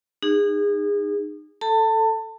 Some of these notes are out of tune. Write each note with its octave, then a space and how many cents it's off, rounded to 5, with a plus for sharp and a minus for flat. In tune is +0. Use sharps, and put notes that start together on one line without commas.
D#4 -30 G#4 -25
A4 +0 A5 +30